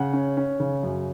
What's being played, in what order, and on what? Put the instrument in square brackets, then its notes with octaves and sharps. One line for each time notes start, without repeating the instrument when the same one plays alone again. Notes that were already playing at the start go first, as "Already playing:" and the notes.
Already playing: [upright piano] C#3 F#5
C#4
C#4
C#3
F#2